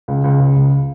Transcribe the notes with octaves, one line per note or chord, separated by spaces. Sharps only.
C#2
C#2
C#3
C#2